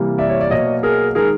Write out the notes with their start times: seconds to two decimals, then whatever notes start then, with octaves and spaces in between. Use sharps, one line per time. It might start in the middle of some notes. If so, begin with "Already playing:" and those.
Already playing: C3 E3 G3 A#3
0.18 D5 E5
0.30 C#5
0.41 D5
0.50 B2 F#3 A#3 C#5 D#5
0.83 G#4 A#4
1.15 D#3 G#3 G#4 A#4